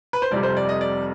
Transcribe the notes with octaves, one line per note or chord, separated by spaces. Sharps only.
B4
C5
F1 F2 C3 G3 D5
C5
D5
D#5
D5